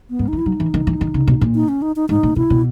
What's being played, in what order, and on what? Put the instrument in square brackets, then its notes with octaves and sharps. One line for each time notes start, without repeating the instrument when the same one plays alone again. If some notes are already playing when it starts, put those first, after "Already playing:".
[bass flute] B3
[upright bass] G#2
[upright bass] E3 [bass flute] D#4
[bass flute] E4
[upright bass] F#3 [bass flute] D#4
[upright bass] E3
D#3
E3
D#3
C#3
B2
A#2
[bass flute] D#4
C#4
D#4
D#4
[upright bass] G#2 [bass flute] D#4
[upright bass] A#2
[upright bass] B2 [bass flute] E4
[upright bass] B2